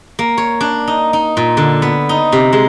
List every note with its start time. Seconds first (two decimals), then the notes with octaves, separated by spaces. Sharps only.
0.19 A#3
0.38 C#5
0.61 D4
0.87 D#4
1.13 D#4
1.37 A#2
1.57 D3
1.82 B3
2.09 D#4
2.32 C3
2.53 G#3